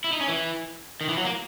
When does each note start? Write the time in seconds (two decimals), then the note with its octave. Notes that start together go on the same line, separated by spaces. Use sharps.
0.04 E4
0.13 D#4
0.21 C#4
0.28 E3
1.01 D#3
1.09 E3
1.17 F#3
1.25 A#3